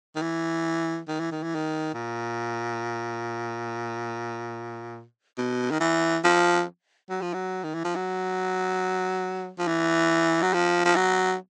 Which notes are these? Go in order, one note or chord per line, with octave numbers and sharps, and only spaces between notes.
D#3
E3
D#3
E3
D#3
E3
D#3
A#2
B2
D#3
E3
F3
F#3
F3
F#3
D#3
E3
F3
F#3
F3
E3
F#3
F3
F3
F#3